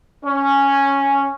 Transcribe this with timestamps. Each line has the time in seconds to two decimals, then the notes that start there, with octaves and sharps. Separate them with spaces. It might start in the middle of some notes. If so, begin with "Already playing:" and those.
0.25 C#4